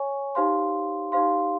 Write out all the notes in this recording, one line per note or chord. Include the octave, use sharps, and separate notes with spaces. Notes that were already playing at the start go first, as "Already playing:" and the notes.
Already playing: C#5 G#5 C#6
D#4 G4 C5 F5 C6
D#4 G4 C5 F5 C6